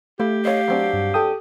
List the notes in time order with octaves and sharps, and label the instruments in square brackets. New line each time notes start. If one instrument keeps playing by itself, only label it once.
[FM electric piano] A3 [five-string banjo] E4 F5 [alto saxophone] G4
[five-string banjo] D#4 C#5 D#5 [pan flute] F5
[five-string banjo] F#3 C4 D4
[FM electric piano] G2
A4 G5 D#6